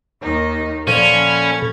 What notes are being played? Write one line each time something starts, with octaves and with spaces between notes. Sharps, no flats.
D#2 D#3 D#4
A#2 D3 F3 C#4 A4 B5 G#6